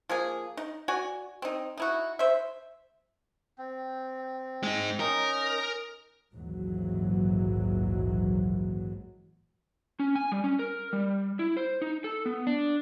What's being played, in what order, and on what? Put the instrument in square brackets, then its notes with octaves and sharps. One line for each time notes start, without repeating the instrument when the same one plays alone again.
[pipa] F3 A#3 G#4
D#4
F#4 D5 G#5
C4 D#4
D#4 E4 F#4
C5 E5
[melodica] C4
[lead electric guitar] G#3 D#4
[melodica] C#4 D#4 [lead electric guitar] A#4
[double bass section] A#1 D#2 G#2 E3 F#3
[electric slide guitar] C#4
G#5
G3
C#4
A#4
G3
E4
C5
D#4
A4
B3
D4